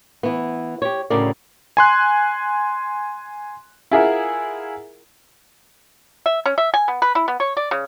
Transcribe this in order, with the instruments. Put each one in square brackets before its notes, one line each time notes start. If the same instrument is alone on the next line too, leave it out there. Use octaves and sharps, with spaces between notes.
[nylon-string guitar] E3 B3
G4 C#5
D2 A2 C#3 A#4 D5
[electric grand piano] G#5 C6 F#6
[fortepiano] E4 F4 G#4 A#4 E5 F#5
[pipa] E5
C#4
E5
G#5
B3
B4
E4
B3
C#5
D5
C#3